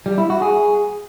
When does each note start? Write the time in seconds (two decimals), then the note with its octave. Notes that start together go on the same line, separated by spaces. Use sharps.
0.06 G3
0.18 E4
0.30 F#4
0.42 G#4